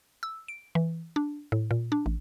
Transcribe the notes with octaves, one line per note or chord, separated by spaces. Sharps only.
E6
D7
E3
D4
A2
A#2
D4
A1